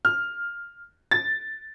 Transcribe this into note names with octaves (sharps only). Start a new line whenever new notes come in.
F6
A6